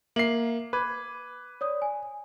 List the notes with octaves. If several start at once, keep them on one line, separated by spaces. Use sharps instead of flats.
A#3 E5 C7 F#7
B4 B5 D6 G#6
C#5 D5 D#6
G#5